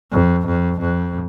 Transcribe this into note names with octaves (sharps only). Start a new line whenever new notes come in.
F2
F2
F2